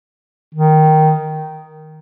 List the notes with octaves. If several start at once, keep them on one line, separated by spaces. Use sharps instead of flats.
D#3